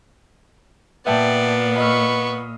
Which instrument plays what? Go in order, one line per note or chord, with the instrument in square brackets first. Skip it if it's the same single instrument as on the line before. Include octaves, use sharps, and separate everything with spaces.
[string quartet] A#2 [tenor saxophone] B3 [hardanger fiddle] D5 [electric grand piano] E5 G5 A5
[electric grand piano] D#5 E6 F6 [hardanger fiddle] B5 C#6